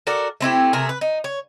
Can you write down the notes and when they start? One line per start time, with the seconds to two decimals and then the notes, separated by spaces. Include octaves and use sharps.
0.07 F#4 A4 A#4 D5
0.41 A3 C4 E4 G4
0.73 C3 A3 G#4 A#4
0.89 B4
1.01 D#4
1.24 C#5